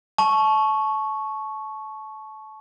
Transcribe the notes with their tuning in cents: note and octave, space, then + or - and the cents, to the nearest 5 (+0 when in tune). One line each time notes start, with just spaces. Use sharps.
A5 -25 C#6 +0